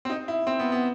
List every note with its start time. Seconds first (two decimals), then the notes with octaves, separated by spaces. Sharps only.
0.05 C4
0.10 D#4
0.28 E4
0.47 C4
0.59 B3
0.72 B3